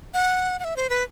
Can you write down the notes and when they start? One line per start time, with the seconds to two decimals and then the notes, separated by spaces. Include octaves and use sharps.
0.14 F#5
0.59 F#5
0.64 E5
0.76 C5
0.90 B4